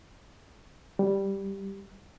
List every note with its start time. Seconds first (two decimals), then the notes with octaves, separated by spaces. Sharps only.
0.99 G3